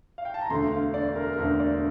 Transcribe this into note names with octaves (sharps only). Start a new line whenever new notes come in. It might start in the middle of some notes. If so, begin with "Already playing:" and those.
F5
G5
A5
A#5
E1 D2 D3 C6
F5
D5
A#4
A#4
E1 D2 D3 C5
D5